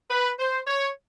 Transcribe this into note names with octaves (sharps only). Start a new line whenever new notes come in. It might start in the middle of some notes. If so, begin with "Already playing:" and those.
B4
C5
C#5